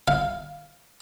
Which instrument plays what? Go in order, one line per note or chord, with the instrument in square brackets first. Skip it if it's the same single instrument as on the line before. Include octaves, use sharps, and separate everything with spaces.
[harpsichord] F5